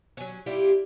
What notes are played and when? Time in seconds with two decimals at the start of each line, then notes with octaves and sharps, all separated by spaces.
0.17 F#3 C#4
0.46 G3 E4 F4 G4